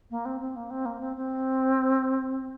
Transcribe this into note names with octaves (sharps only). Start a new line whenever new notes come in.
A#3
C4
C4
A#3
C4
A#3
C4
C4